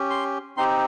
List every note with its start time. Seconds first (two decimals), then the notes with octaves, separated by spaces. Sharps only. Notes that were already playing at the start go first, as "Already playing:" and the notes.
Already playing: C#4 G4
0.10 C6
0.57 C4 D#4 G4 C6